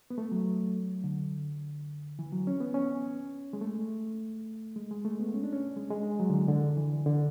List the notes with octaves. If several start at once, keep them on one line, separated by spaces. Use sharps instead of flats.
B3
A3
F#3
D3
E3
F#3
C#4
B3
C#4
G#3
A3
G#3
G#3
A3
B3
C#4
D4
C#4
G#3
G#3
F#3
D3
E3
D3
E3
D3